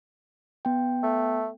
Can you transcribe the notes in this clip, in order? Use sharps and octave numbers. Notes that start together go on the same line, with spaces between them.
B3 G5
A3